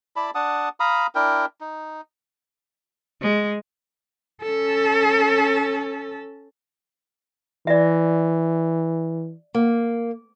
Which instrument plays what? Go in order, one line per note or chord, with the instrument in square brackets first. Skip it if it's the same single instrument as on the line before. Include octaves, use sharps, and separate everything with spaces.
[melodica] E4 D5 A5 B5
D4 F#5 A5 D#6
F5 A#5 B5 D#6
D4 E4 A#4 G5
D#4
[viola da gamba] G#3
[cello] C#4 A4
[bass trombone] E3 [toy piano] D5 E5
[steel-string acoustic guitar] A#3